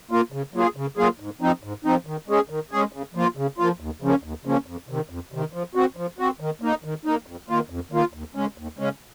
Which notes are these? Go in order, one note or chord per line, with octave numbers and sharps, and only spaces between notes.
A#3 F4
C#3
F#3 A#3 F4 G#4
C#3
F#3 A#3 F4 G#4
G#2
F3 C4 D#4
G#2
F3 C4 D#4
D#3
G#3 C#4 G#4
D#3
G#3 C#4 G#4
C#3
F3 A#3 F4
C#3
F3 A#3 F4
D#2
C#3 F3 A#3 C#4
D#2
C#3 F3 A#3 C#4
F2
C3 D#3
F2
C3 D#3
F3
C4 F#4
F3
C4 F#4
D#3
A#3 D#4
D#3
A#3 D#4
F2
D#3 A#3 F4
F2
D#3 A#3 F4
D#2
C#3 G#3 C#4
D#2
C#3 G#3 C#4